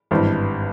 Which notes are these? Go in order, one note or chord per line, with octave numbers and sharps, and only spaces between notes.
G#1 G2 E3